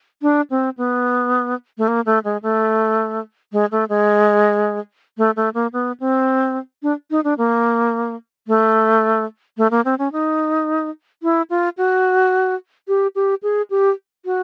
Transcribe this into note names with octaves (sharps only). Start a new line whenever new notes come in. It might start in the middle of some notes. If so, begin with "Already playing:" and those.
D4
C4
B3
A3
A#3
A3
G#3
A3
G#3
A3
G#3
A3
A3
A#3
B3
C4
D4
D#4
D4
A#3
A3
A3
A#3
C4
C#4
D#4
E4
F4
F#4
G4
G4
G#4
G4
F#4